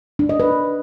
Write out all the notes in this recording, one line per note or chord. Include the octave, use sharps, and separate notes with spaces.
D4
D#5
B4